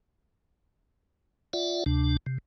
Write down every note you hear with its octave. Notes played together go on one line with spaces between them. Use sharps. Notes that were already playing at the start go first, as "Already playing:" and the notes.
F4 D5 E5 F#5
D2 C3 D4
C3